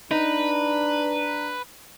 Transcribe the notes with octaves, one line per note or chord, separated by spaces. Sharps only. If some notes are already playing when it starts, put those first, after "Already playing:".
D4 D#4 B4 A#5